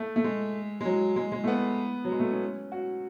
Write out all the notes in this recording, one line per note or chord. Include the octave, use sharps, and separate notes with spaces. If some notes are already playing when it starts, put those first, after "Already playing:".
Already playing: A3
A3
G#3
G#3
F#3
G#3
G#3
A3
B3
F#3
G#3
A3
C#4
F#4